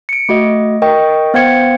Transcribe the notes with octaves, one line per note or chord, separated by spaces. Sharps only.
C#7 D7
A3 F#4 D#5
A#4 D#5 G5 C#6
B3 C5 F5 G5 G#6 C#7